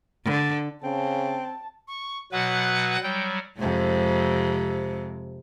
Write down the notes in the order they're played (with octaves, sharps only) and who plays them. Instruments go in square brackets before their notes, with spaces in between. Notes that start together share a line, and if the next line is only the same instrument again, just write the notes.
[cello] D3
[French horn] C#3 [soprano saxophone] C4 [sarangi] A5
[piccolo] C#6
[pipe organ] B2 F#3 B4 [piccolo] F#5
[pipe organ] F#3 G3 [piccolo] G5
[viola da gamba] F2 C3 G#3